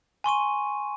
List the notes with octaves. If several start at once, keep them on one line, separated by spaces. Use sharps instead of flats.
G#5 C6 C#6 D#7